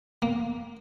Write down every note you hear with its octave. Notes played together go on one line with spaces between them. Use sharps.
A#3